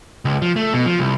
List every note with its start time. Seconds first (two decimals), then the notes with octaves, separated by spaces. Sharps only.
0.25 C#2
0.42 F3
0.56 A3
0.73 B2
0.86 F3
0.99 C2